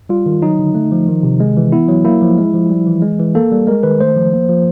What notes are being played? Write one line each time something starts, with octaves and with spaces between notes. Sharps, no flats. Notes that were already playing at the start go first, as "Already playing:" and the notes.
G3 F4
D#3
F#3 D#4
D3
A3
F3
D#3
C3
G#3
E3
B3 E4
F#3
A#3 E4
F3
G#3
F3
G3
E3
G#3
E3
A#3 A4
G3
G#3 A#4
D#3 B4
A3 C5
F3
A#3
F3